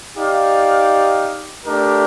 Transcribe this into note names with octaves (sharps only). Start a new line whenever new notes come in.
D#4 G4 D5 F5
A3 D4 G4 A#4